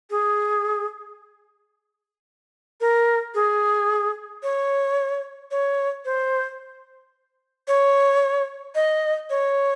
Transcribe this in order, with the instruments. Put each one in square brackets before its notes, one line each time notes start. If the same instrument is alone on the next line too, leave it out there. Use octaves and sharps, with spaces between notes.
[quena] G#4
A#4
G#4
C#5
C#5
C5
C#5
D#5
C#5